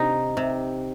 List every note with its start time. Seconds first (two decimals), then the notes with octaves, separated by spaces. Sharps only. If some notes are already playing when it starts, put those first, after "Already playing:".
Already playing: C3 D#4
0.37 C3